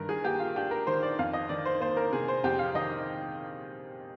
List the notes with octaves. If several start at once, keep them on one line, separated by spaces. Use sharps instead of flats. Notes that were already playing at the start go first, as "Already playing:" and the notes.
Already playing: G2 D#3 D4 A#4
G#4
A#3 G4
F4
D4 G4
A#4
D#3 C5
D5
F2 F5
D#5
D#3 D5
C5
A#3 C5
A#4
C3 G#4
C5
F2 G4
F5
D#3 D#5